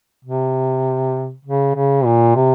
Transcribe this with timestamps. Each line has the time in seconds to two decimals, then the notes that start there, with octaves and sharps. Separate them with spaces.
0.25 C3
1.45 C#3
1.76 C#3
2.05 A#2
2.36 C3